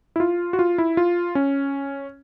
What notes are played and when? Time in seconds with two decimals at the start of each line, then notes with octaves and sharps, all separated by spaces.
0.16 E4
0.20 F4
0.53 F#4
0.59 F4
0.78 E4
0.97 F4
1.35 C#4